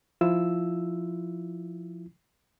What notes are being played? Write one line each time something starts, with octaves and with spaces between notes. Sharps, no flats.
F3 E4 F4 E6